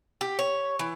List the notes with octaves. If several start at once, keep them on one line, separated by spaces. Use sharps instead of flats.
G4
C#5
E3